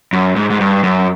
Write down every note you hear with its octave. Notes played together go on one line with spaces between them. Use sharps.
F#2
G#2
G#2
G2
F#2